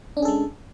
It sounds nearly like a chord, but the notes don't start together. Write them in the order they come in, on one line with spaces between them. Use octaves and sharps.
D4 C#4 G#4 A4 G#3